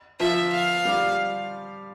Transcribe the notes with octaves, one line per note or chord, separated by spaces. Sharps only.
F3 F4 E5
F5
G3 G4